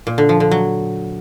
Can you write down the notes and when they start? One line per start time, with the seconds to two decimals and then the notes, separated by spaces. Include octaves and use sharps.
0.07 A#2
0.18 D3
0.29 F3
0.40 D3
0.51 F#3